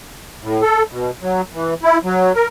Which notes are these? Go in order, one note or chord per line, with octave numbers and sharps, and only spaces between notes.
A2
A4
B2
F#3
E3
E4
F#3
A#4